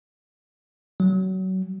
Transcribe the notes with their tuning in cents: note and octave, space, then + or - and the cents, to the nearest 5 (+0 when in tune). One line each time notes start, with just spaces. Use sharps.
F#3 +25